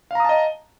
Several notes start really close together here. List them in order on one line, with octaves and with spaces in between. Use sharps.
F5 A#5 D#6 A5 D#5